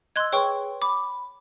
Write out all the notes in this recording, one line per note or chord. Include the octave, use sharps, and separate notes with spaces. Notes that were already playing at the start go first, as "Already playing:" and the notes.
D#5 C6 E6 F#6 G#6
G#4 B4 C#5 G5 C6 C#6
B5 D6